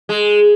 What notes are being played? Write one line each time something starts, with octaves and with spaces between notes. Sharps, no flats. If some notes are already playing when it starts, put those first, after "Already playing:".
G#3